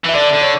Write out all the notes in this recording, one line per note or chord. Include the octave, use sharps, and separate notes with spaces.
E3
E5
D3 D5
D3
C#5